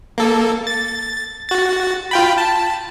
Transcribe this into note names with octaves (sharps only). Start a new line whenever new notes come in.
A#3 A4
A6
F#4 A6
F4 G5 B5
A5